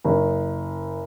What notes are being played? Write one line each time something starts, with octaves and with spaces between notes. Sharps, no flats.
F#1